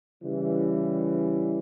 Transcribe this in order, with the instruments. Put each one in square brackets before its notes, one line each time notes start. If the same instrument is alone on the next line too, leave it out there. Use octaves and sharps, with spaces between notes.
[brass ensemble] C#3 E3 G3